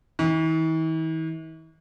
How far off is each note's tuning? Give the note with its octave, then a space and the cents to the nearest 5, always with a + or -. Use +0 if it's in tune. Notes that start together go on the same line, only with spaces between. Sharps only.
E3 -45